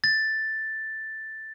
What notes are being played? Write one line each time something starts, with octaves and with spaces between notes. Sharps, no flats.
A6